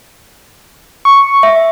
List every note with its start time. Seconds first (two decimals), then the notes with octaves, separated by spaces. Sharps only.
1.05 C#6
1.43 E5